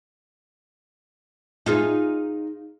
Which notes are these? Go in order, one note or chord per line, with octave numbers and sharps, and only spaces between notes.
D#4 F4 G#4